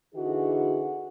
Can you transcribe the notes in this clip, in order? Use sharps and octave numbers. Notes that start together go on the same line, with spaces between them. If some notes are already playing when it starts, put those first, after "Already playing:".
D3 E3 D#4 F#4 G#4